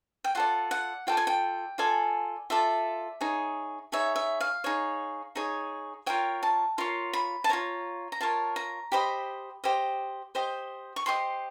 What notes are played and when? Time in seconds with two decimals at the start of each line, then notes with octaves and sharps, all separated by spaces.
0.24 G5
0.35 F4 A4 D5 F#5
0.71 F#5
1.07 F4 A4 D5 G5
1.17 G#5
1.27 G5
1.78 F4 A4 D5 G#5
2.50 F4 A4 D5 E5
3.21 D#4 G#4 C#5
3.92 D#4 G#4 C#5 E5
4.16 E5
4.41 F5
4.64 D#4 G#4 C#5
5.35 D#4 G#4 C#5
6.06 F4 A#4 C#5 G5
6.43 A5
6.78 F4 A#4 C#5 C6
7.13 B5
7.44 A5
7.49 F4 A#4 C#5 A#5
8.12 A#5
8.21 F4 A#4 C#5 A5
8.56 A#5
8.92 G4 C5 D#5 B5
9.64 G4 C5 D#5
10.35 G4 C5 D#5
10.96 C#6
11.06 G4 C5 D#5 C6